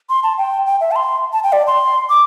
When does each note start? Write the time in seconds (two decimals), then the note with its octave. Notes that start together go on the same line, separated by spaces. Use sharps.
0.10 C6
0.23 A5
0.38 G5
0.66 G5
0.81 E5
0.91 A5
0.96 C6
1.33 A5
1.44 G5
1.53 D5
1.67 C6
2.10 D6